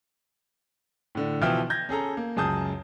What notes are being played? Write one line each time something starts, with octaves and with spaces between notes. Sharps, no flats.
A2 D3
B2 E3 F3 E5 G5 F6
G6 G#6 A#6
C#4 G#4 A4 A#5
A#3
C#2 F#2 G#4 A5 D#6 G6